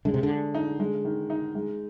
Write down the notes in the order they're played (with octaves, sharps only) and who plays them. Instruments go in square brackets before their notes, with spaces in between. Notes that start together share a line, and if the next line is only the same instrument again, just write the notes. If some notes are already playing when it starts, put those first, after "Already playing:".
[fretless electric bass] D3 [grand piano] G#3
[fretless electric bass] C3
D3
[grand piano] G#4
D#4
G#3
D#3
D#4
G#3